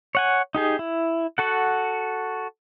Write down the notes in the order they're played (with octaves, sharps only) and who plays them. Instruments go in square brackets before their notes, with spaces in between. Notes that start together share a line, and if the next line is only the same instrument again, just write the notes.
[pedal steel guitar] C#5 F#5 G#5
D#4 G4 G#4
E4
F#4 A4 F#5